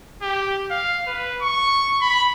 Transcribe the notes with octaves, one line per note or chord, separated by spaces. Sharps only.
G4
F5
B4
C#6
B5